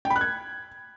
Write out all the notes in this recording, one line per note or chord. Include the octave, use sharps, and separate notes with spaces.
G5
B5
F#6
G#6